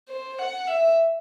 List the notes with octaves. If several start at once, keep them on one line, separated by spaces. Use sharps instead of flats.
C5
F#5
E5